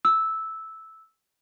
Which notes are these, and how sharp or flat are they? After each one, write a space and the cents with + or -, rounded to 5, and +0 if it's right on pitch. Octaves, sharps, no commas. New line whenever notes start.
E6 -10